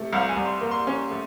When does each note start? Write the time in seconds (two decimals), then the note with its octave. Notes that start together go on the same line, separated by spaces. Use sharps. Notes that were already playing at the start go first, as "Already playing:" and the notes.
Already playing: C3 A3
0.13 C2 F5
0.29 G#5
0.36 C2
0.45 C6
0.61 A#3
0.71 C6
0.87 C#4
1.11 A3